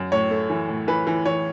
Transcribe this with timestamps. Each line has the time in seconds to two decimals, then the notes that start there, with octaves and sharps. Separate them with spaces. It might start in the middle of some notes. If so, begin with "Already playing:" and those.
Already playing: F#2
0.12 A2 C#5
0.31 A3
0.50 E3
0.69 A2
0.88 E3 B4
1.07 E3
1.25 E3 C#5